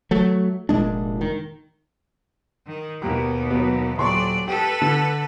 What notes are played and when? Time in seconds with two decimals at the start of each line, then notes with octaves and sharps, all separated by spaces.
0.11 F#3 A3
0.69 F1 A#2 G#3 D4
1.21 D#3
2.66 D#3
3.02 D#2 B2 A#3 G4
3.50 F#3 B3
3.98 D#1 F#3 D5 C6 C#6
4.48 G4 A4 B4
4.82 D3